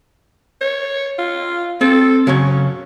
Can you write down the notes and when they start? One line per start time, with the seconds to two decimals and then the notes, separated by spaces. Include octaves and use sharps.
0.61 C#5
1.18 F4
1.81 C4 A4
2.27 C#3 F#3 C#4 C#5